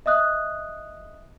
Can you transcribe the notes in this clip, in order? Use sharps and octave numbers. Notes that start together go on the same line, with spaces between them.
D#5 E5 D#6 F#6